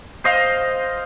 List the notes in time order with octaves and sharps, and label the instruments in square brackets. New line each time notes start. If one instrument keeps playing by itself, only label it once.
[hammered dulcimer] C5 D#5 F5